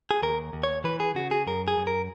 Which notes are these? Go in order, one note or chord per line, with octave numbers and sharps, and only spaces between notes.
G#4
D#2 A#4
D#2
C#5
E3 B4
G#4
C#3 F#4
G#4
F#2 A#4
G#4
F#2
A#4